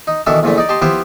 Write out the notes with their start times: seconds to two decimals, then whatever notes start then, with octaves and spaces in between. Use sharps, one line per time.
0.07 D#4
0.26 B2 D#3 E3 D4 E4 A4
0.43 A#1 E2 A#2 D3 A3
0.58 D#4 D5
0.69 G4 D#5 A5 C6
0.82 F3 B3 E4 G4 B4 C5